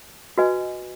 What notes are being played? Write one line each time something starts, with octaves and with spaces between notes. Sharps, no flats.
F#4 B4 D#5 G#5